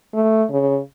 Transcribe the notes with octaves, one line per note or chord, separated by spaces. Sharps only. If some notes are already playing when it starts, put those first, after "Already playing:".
A3
C#3